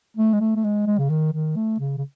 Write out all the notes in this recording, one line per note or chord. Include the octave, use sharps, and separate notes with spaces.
A3
G#3
A3
A3
G#3
G#3
C#3
D#3
D#3
A3
C#3
C#3